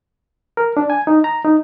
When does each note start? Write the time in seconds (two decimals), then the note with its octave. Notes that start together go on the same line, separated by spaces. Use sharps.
0.57 A#4
0.77 D4
0.90 G#5
1.07 D#4
1.24 A#5
1.44 D#4